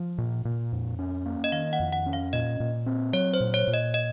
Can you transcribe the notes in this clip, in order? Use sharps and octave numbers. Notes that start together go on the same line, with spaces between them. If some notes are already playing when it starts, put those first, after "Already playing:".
Already playing: F3
A#2
A#2
F2
C#4
A#3
D#5
D#3 F5
F#5
F2
F#5
C#4
F5
A#2 D#5
A#2
C4
F#3 C#5
C5
A#2
C#5
A#2
D#5
D#5